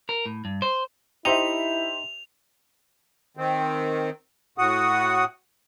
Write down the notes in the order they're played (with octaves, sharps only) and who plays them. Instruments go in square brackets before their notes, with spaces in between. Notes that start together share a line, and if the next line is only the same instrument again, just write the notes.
[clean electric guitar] A#4
A2
G2
C5
[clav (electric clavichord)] D#4 D#5 [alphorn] E4 [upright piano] G4 C5 E5 [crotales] F7
[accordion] D#3 C4
A2 F#4 F#5 D#6